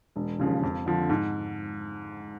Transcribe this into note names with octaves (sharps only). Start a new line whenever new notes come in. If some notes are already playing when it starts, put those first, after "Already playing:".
E1
D#2 C#3 F3
F2
D3 F3
G#2